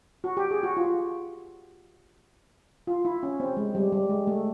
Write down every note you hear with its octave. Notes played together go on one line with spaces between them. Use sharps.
F#4
G4
G#4
F#4
F4
F4
E4
C#4
C4
G#3
G3
G3
G#3
A3